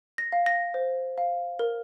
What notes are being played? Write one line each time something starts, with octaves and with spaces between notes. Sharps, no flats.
A#6
F5
A#6
C5
F5
A#4